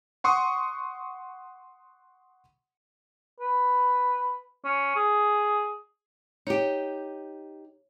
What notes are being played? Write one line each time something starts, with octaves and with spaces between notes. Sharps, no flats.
F#5 C6 C#6 D#6
B4
C#4
G#4
D#4 G4 C#5